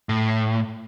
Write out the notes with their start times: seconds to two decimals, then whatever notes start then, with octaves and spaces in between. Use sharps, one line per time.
0.09 A2